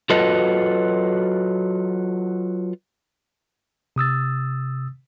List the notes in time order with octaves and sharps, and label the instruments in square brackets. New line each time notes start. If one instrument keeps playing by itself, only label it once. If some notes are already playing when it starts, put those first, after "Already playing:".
[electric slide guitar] F#3 F4 F#4 A4 B4 D#5
[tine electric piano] C3 D#6 E6 A6